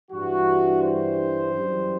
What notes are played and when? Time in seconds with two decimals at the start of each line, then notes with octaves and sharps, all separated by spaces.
0.11 G2 E3 G3 F#4
0.82 C5
1.53 F#2 E3 G3